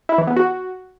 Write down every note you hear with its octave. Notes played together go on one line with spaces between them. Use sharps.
E4
E3
B3
F#4